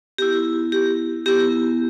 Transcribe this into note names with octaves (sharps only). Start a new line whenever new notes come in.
B3 E4 G4
G4
B3 E4 G4